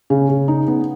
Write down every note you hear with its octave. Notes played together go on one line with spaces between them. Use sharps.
C#3
C#3
D#4
B3